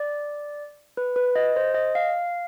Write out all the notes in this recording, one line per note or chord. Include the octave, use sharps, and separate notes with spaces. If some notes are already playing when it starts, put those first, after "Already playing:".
Already playing: D5
B4
B4
D#5
C5
D#5
F5